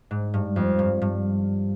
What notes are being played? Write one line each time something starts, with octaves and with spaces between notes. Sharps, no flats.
G#2
G2
F2
G2
G2